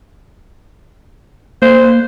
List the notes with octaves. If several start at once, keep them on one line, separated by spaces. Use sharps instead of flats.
A#3 C5